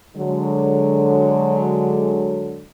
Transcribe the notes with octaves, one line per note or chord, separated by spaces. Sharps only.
D3 F#3 G#3